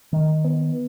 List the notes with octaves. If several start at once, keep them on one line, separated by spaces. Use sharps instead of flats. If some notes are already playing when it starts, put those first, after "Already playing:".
D#3
B3